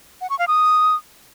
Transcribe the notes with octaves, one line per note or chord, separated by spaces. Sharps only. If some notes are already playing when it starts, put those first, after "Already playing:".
F#5
C#6
F5
D#6